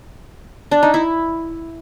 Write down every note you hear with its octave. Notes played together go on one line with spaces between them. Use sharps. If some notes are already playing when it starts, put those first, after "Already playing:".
D4
D#4
E4